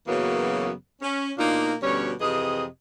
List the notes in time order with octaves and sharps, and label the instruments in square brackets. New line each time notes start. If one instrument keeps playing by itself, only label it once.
[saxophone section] F#2 C#3 E3 F#3 A#3 B3
C#4
B2 A#3 D4 D#4 F4
D2 B2 G3 C#4 C#5
F2 C3 E3 G#4 D#5